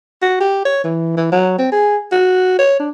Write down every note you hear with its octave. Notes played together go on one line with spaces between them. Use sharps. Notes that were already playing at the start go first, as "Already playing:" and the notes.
F#4
G4
C#5
E3
E3
F#3
C4
G#4
F#4
C#5
D4